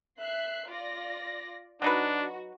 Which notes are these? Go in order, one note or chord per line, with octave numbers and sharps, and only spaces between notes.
E5 F#6 C7
F4 D5 A#6
F#3 D4 D#4 F#4 B4